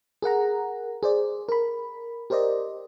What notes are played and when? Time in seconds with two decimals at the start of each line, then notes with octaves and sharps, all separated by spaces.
0.22 G#4 A#4 F#5 A#5
1.03 G#4 C5 D5
1.49 A#4 B5
2.30 G4 A#4 C5 D5 D#5